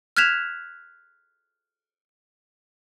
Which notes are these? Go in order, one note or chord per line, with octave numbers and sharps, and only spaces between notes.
F6 F#6 G#6 B6 E7 F7